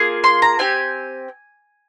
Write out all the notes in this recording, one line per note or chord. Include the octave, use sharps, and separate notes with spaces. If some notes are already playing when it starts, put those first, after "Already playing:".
Already playing: A#3 F4 G#4
C6
A#5
C4 G4 G#5